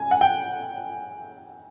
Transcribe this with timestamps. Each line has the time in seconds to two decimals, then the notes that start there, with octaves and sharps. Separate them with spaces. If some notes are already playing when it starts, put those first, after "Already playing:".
Already playing: G#5
0.11 F#5
0.21 G5